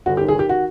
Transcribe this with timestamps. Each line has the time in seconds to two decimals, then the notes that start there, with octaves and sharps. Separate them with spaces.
0.06 G1 F#4
0.17 G4
0.21 D#3
0.28 G#4
0.35 D#3 G4
0.49 F#4